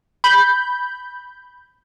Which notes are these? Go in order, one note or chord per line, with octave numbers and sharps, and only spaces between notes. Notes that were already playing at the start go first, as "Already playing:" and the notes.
B5 G6